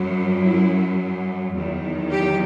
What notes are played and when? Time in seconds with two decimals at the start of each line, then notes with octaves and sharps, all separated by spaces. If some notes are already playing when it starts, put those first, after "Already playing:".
Already playing: F#2 F#3
0.41 E4
1.53 E2 D#3 F#3
2.11 G4